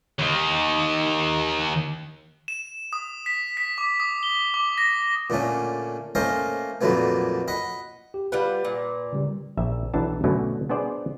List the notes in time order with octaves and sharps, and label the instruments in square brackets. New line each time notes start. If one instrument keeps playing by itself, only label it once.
[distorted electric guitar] D#2 D#3
[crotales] E7
D#6
B6
B6
D6
D#6
G7
D6
A#6
[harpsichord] A#2 D3 A3 C#4
A3 A#3 C#4 C5 D#5 F5
F2 A#2 D3 F#3 A3 B3
D#5 F#5 B5
[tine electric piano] G4
[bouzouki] G3 F4 F#5 [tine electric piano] B4
[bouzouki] A#2
[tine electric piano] C#3 G3
[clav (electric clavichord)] A#1 E5
B1 E3 F#3 D4 A5
B2 D3 F#3 A3 C#4
B3 D4 G#4 C5 D5 D#5